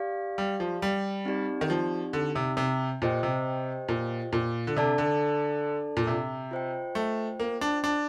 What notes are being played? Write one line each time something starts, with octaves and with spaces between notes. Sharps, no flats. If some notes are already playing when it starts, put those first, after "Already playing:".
Already playing: G4 D5 F5
G3
F3
G3
C4 D#4 G4 D5
D#3
F3
D3
C3
C3
A#2 G4 C5 D#5 G5
C3
A#2
A#2
D3
C3 D4 A4 D5 A5
D3
A#2
C3
F4 C5 D#5 G5
A3
A#3
D4
D4